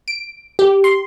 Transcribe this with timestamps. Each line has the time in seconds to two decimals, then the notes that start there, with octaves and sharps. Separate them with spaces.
0.08 D7
0.59 G4
0.84 C6